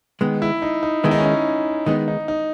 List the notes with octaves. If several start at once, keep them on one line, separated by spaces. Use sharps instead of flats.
D#3 G#3 B3
E4
D#4
D#4
D#3 G#3 B3 E4
D#4
C#4
D#4
D#3 G#3 B3 D#4
D#4
D#4